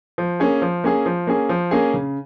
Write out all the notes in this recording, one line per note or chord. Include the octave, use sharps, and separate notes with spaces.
F3
A#3 C#4 G#4
F3
A#3 C#4 G#4
F3
A#3 C#4 G#4
F3
A#3 C#4 G#4
C#3